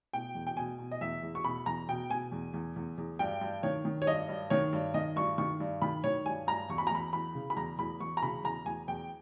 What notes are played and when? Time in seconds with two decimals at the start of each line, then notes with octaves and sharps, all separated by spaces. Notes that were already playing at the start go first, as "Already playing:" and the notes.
0.13 B2 G5
0.35 E2
0.47 G5
0.57 B2 G#5
0.79 B2
0.92 D#5
1.01 E2 E5
1.23 E2
1.35 C#6
1.45 B2 B5
1.66 E2 A#5
1.88 B2 G5
2.10 B2 G#5
2.32 E2
2.54 E2
2.76 E2
2.98 E2
3.19 G2 G5
3.41 G2
3.63 D#3 C#5
3.85 D#3
4.02 C#5
4.07 G2 D#5
4.29 G2
4.50 D#3 C#5
4.73 G2
4.94 D#3 D#5
5.16 G2 C#6
5.38 D#3 C#6
5.60 G2
5.82 D#3 B5
6.04 D#3 C#5
6.26 G2 G#5
6.47 G2 A#5
6.69 E2 C#6
6.78 B5
6.87 A#5
6.91 E2 B5
7.13 E3 B5
7.35 C#3
7.50 B5
7.57 E2 A#5
7.79 E2 B5
8.00 E2 C#6
8.17 A#5
8.23 C#3 B5
8.44 E2 A#5
8.66 E2 G#5
8.88 E2 G5